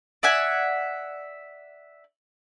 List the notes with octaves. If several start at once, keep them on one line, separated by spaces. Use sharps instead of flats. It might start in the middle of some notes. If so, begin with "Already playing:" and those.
D5 E5 F#5 G#5